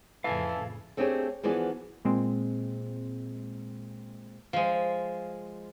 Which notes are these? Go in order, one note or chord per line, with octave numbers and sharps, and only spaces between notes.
F2 A2 C#3 E3 A4 F5 G#5
A3 C4 D4 G4 G#4 C#5
E3 F3 B3 F#4 G#4 D5
A#2 G#3 C4
F3 G#3 F5